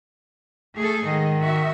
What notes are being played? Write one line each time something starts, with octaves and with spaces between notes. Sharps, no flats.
A3 G#4 A4
G#2 D#3 D#5
F#4 E5